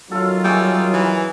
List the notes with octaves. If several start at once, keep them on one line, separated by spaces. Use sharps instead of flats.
F#2 D#3 F#3 F4 A4 F5
G3 G#4 E5 C#6
E3